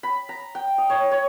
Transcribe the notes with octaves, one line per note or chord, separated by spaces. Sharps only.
B5
A#5
G5
D#5
C#5
C#5